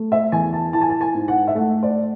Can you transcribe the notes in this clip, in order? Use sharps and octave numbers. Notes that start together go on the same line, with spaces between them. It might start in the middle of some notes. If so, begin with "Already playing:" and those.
Already playing: A3
E5
E2 G#5
A5
E4 A5
G#5
A5
G#5
G#2
F#5
E5
A3 F#5
D5